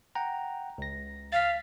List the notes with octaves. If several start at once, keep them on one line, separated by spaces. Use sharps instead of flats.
F#5 G5 A#5
C#2 A#6
F5 A6 B6